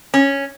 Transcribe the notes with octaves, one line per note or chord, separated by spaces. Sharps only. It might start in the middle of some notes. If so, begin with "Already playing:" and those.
C#4